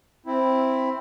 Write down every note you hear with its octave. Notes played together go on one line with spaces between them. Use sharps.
C4 E4